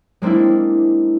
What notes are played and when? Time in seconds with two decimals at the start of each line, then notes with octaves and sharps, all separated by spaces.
0.22 G#3 A#3 C4 D4 E4